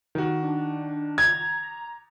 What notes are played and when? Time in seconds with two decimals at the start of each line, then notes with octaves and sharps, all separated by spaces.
0.15 D#3 F#4
0.43 D4
1.18 A#5 G#6